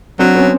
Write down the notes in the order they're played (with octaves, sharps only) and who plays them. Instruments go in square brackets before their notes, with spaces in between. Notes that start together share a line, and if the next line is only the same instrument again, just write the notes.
[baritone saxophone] F#3 [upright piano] C4 D4
[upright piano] B3 C#4